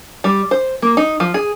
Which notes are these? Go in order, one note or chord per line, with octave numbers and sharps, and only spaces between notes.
G3
C5
A#3
D#4
F3
G#4